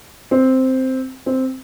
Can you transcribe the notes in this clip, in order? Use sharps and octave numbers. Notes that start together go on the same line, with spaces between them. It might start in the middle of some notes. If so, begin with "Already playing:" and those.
C4
C4